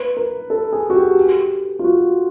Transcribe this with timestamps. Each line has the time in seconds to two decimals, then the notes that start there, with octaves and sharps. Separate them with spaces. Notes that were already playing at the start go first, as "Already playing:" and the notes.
Already playing: B4
0.17 A#4
0.50 A4
0.72 G#4
0.90 F#4
0.95 G4
1.79 F4
1.84 F#4